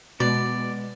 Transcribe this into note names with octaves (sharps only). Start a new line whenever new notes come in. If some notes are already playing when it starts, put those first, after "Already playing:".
B2 G#3 B3 D5